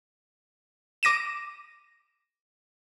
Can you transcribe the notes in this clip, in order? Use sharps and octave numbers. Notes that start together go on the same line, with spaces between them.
D6 A#6 D#7 E7